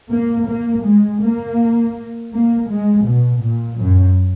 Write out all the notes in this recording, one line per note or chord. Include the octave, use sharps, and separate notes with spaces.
A#3
A#3
G#3
A#3
A#3
G#3
B2
A#2
F#2